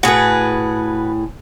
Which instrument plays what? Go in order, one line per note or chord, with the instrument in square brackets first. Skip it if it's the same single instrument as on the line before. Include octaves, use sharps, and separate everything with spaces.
[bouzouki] A2 G#4 [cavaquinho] F#4 B4